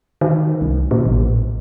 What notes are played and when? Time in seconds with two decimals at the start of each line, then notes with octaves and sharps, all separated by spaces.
0.21 D#3
0.61 C2
0.91 A#2
1.06 A1